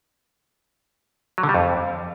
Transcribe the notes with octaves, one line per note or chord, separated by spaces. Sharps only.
F#3
D3
G3
F2